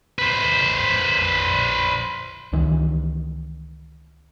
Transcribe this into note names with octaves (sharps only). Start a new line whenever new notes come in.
B4 C5
C#2 D#3 E3